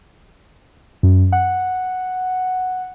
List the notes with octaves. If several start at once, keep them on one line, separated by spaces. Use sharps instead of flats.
F#2
F#5